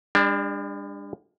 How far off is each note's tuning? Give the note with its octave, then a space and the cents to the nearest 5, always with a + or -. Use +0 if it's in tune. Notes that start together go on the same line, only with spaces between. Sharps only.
G3 +45 D4 +0